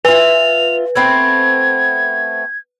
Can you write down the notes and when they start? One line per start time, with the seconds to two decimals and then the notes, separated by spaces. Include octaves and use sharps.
0.05 F4 B4 E5 F7
0.95 A3 B3 C4 G#6